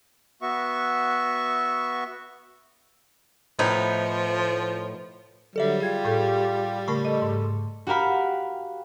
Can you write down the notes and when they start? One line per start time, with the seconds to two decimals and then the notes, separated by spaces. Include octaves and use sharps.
0.42 B3 F#4 E5 C#6
3.59 A2 F3 B3 D#4
5.56 D3 F#3 G3 A4 D5 E5
5.80 F4 G4 G#4 G#6
6.05 A2 A4 G6
6.88 C#3 A3 A#4 B5 C#6
7.05 A4 D#5
7.22 G#2
7.87 F#4 G4 A#4 F5 B5